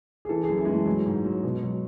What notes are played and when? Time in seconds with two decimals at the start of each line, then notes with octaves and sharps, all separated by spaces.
0.25 G#4
0.29 E3 A4
0.44 F#2 G#4
0.58 E4
0.65 G#3
0.68 E3 A3
0.86 F#3 G#3
1.06 G#2
1.25 F#3
1.43 B2
1.63 F#3